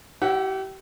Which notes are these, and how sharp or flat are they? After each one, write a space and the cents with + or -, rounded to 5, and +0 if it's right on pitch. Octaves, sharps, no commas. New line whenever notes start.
E4 +0 G4 -35 F#5 +0